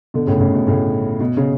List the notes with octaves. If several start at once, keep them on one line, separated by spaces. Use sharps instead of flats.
B2 D3
A2 C#3
A2 C#3
B2
A2 C#3
B2
C#3